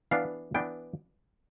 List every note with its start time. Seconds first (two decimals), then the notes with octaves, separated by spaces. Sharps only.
0.11 E3 B3 D4 F5
0.54 E3 B3 D4 G5